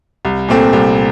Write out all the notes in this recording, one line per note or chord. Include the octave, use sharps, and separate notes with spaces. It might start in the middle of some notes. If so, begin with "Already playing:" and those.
C2
A#2 A3 C4
C2